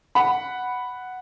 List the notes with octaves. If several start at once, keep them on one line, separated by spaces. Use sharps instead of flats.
F#5 B5